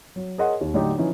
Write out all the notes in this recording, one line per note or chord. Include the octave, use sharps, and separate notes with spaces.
F#3
G#4 A#4 C#5 D#5 F#5 C6
D#2
A2 D3 F#3 D4 D#4 G4
E3 F3 C#4 D#4